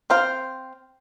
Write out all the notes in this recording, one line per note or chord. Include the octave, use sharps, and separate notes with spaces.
C4 C5 F5